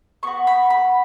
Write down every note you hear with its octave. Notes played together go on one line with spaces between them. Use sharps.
B3 F#4 C#6
B5
B5